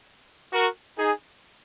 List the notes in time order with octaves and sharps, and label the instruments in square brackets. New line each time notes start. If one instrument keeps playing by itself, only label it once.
[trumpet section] F#4 A#4
D#4 G#4